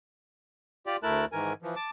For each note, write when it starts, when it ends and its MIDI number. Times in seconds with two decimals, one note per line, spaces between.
0.87 0.97 65
0.87 0.97 67
0.87 0.97 74
1.03 1.25 38
1.03 1.25 57
1.03 1.25 64
1.03 1.25 70
1.03 1.25 81
1.03 1.25 90
1.32 1.53 44
1.32 1.53 51
1.32 1.53 52
1.32 1.53 70
1.32 1.53 80
1.62 1.75 52
1.62 1.75 53
1.76 1.90 81
1.76 1.90 86